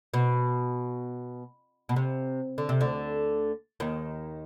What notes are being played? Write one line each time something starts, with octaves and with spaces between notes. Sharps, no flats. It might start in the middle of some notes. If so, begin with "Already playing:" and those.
B2
B2
C3
D3
C3
D2 D3
D#2 D#3